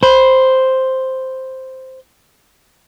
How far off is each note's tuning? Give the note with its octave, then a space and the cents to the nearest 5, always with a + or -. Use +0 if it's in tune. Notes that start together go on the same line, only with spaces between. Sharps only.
C5 +0 B5 +0